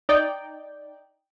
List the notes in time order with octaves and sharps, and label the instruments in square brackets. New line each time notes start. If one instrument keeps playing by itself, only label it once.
[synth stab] D#4 D5 G5